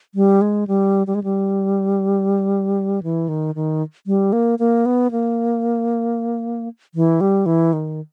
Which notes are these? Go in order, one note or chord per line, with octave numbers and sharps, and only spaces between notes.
G3
G#3
G3
G3
G#3
G3
E3
D#3
D#3
G3
A#3
A#3
B3
A#3
E3
G3
E3
D#3